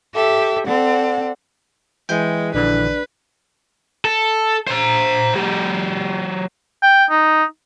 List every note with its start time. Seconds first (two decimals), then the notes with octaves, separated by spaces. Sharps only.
0.14 G4 A4 E5
0.67 C4 A4 D5 F#5
2.09 E3 G#3 G5 G6
2.54 A#1 D3 E3 D4 B4
4.05 A4
4.67 C5 A#5
5.34 F#3 G4
6.83 G5
7.10 D#4